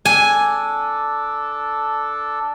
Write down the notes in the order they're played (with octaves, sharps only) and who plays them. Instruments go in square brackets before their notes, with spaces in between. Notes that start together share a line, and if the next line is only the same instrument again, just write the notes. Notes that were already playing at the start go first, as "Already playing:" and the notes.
[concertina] D4 A4 [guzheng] G#5